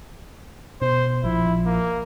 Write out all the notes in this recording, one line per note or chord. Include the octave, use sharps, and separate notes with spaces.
B2 C5
A#1 F3 E4
A#3